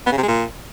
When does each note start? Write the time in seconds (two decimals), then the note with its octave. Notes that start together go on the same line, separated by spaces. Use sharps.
0.06 B3
0.12 C#3
0.17 C3
0.23 G#3
0.28 A#2